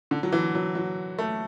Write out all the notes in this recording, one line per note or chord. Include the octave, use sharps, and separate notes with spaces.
D3
F#3
E3
F#3
F#3
A3